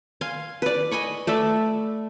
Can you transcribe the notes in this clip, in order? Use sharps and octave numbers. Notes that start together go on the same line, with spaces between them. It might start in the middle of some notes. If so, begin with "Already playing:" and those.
F5 G#5 C6
B4 D5
D#5 G#5 B5 C#6
A3 D5 E5 B5